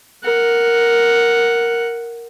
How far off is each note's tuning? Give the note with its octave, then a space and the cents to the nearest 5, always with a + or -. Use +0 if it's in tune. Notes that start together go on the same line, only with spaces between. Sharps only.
A#4 +0 F#5 +0